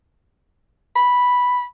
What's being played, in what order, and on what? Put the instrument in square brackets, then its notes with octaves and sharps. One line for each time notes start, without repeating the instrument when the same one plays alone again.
[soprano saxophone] B5